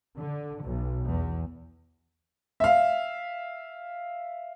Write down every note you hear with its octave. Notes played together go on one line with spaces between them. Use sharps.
D3
B1
E2
E5 F5